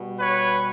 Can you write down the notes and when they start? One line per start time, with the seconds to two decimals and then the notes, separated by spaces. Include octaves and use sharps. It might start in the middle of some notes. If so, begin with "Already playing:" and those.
Already playing: B2 G3
0.19 B4 C#5